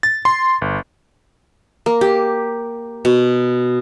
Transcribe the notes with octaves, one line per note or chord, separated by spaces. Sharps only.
A6
C6
G1
A#3
G4
B2